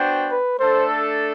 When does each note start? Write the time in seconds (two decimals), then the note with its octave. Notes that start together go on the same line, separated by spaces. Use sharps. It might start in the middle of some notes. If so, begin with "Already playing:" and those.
Already playing: B3 D4 F#4 C5 G5
0.31 B4
0.59 A3 D4 A4 C5